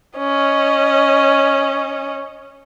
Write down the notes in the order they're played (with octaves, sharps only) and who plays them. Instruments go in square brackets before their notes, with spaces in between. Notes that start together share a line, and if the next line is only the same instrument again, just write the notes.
[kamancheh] C#4 D#5